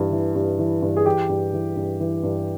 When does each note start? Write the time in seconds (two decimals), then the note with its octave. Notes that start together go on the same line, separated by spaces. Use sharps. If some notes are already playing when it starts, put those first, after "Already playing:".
Already playing: G2 E3
0.12 E3
0.35 G2
0.59 E3
0.82 G2
0.96 G#4
1.06 E3 G4
1.29 G2
1.53 E3
1.76 G2
2.00 E3
2.23 G2